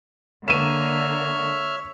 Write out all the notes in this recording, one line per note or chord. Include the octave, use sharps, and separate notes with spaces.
D3 A#3 C#5 E5 F6 D#7 E7